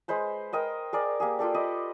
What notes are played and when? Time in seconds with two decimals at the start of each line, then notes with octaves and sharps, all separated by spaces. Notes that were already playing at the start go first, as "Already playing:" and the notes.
0.08 G#3 B4 C5 B5
0.53 A#4 D#5 G5
0.93 G#4 A#4 D5
1.20 A#3 G4 G#4
1.39 F4 G4 A4 D5
1.54 B4 D5 D#5